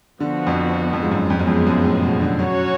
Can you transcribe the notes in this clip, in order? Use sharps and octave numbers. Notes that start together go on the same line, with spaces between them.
D3 F3 B3 F#4
F2
F2
G#2
F#2
F2 F3 G#3 B3
F#2
F2
F#2
A2
B2
D3
F#3 C#4 F#4 C#5